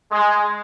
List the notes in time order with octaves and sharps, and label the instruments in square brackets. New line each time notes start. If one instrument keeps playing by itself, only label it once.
[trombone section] G#3